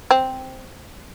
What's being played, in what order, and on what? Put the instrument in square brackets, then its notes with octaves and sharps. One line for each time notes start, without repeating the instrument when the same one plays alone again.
[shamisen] C4